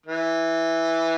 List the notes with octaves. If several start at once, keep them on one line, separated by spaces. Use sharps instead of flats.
E3